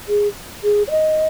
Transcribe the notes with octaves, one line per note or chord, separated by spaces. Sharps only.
G#4
G#4
C#5
D#5